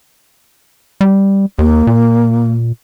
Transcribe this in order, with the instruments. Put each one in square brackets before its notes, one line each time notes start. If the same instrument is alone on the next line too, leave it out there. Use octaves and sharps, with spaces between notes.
[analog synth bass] G3
[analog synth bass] D#2 [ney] A#3
[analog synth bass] A#2